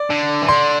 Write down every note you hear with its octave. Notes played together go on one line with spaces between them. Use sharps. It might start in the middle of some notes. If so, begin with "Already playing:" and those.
Already playing: D5
D3
E3
D3 C6